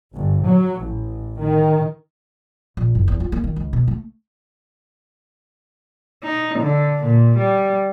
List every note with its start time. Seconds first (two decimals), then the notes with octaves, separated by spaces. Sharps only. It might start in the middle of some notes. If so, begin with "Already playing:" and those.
0.14 G1
0.44 F#3
0.79 A1
1.40 D#3
2.77 A#1
2.95 F#1
3.08 E2
3.20 F4
3.32 A#3
3.44 D#3
3.56 C#2
3.73 B2
3.87 A3
6.23 D#4
6.59 D3
7.03 A#2
7.37 G3